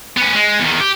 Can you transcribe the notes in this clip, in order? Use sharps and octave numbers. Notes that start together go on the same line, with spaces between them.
B3 C#4
G#3
E2 D#3
G4